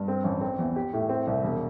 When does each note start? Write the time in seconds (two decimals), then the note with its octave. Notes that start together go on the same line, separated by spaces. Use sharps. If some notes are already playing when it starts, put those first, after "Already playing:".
Already playing: G2
0.08 C4
0.24 A1
0.41 C4
0.59 E2
0.76 G4
0.93 A2
1.09 C4
1.27 C2
1.44 E1